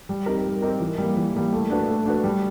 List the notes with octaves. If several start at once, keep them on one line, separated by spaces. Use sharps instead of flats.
G3
C4 D#4 G4 A#4
G3
C4 D#4 G4 A#4
E3
G3 A#3
E3
G3 A#3
A3
D4 F#4 B4
A3
D4 F#4 B4
G3